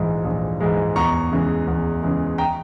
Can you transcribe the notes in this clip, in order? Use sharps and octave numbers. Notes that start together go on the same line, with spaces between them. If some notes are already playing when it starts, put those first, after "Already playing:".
Already playing: A#1 G#2 E3 G#3
A#1
G#2 E3 G#3
E2 A#5 C#6
C#3 E3 G#3
E2
C#3 E3 G#3
G5 A#5